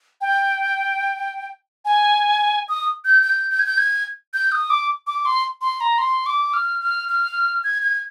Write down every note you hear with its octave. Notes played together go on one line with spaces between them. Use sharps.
G5
G#5
D#6
G6
G6
G6
G#6
G6
G#6
G6
D#6
D6
D6
C6
C6
A#5
C6
D6
F6
F6
F6
G#6
G#6